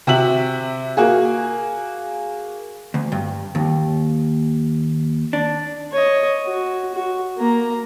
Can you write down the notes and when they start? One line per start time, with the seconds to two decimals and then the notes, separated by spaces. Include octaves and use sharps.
0.07 C3 F#4 E5 F#7
0.97 A#3 F#4 G#4
2.94 D2
3.12 G2
3.55 D#2
5.33 D4
5.92 C#5 D#5
6.46 F#4
6.95 F#4
7.38 A#3 A#5